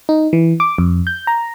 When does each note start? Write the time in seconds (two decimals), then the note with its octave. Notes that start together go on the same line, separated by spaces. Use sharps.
0.09 D#4
0.33 E3
0.60 D6
0.78 F2
1.07 G6
1.27 A#5